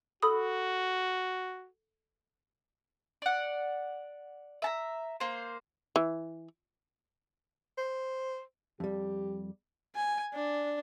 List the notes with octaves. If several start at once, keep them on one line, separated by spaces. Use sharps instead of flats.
F#4 A4 B5 D#6
D5 F#5
E5 A5 A#5
A#3 C5
E3
C5
F2 G3 G4
G#5
D4